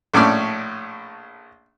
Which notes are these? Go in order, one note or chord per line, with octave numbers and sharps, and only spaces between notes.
A#1 A2 C#4 D5